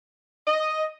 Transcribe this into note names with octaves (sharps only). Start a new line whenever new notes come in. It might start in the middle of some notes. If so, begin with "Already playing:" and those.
D#5